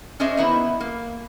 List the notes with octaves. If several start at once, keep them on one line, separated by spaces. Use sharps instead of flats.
C#4 D4 G#4 C5 D#5 E5
D#3 B3 E4
A#3